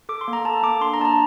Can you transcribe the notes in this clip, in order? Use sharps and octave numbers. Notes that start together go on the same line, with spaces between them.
A4 D6
C6
A#3
A#5
A4 A5
A#3 D6
D4 C6
A#5
D4 A5
A#5